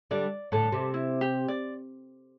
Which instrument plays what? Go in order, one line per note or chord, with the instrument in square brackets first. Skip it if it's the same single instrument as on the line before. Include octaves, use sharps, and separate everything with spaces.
[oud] D3 G3 [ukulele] D5
[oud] A2 D3 [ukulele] A4
[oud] C3
[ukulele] E4
G4
D5